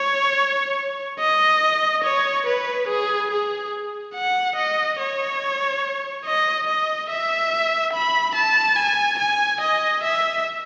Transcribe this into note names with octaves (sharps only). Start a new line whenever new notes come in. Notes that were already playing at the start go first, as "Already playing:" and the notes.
Already playing: C#5
D#5
C#5
B4
G#4
G#4
F#5
D#5
C#5
D#5
D#5
E5
B5
A5
G#5
G#5
D#5
E5